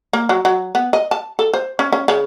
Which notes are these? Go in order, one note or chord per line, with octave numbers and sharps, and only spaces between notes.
A#3
F#3
F#3
B3
D#5
A5
A4
C5
C#4
C#4
C#3